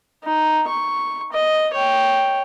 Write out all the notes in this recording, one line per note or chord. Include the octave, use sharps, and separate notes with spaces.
D#4
C#6
D#5
C#5 G5